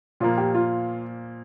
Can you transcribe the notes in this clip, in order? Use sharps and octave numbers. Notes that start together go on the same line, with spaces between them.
A#2 F3 A#3 F4
G4
F4